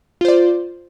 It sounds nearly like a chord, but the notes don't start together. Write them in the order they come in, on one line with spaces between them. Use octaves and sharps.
F4 C5 D5